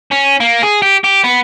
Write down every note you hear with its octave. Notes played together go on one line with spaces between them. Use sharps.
C#4
A#3
G#4
G4
G4
B3